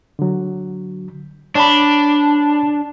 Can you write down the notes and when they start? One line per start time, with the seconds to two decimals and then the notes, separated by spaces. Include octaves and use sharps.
0.19 D3 F#3
1.55 D4 C#5 A5 B5